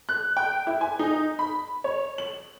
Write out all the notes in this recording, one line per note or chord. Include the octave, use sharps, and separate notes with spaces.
F#6
G5
E4
G#5
D#4
B5
C#5
F#7